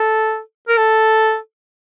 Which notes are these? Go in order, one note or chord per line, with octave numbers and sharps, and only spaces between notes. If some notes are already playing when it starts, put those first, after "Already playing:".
Already playing: A4
A#4
A4